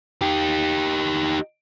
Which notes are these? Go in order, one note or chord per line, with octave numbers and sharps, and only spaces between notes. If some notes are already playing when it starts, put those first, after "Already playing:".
D#4 G4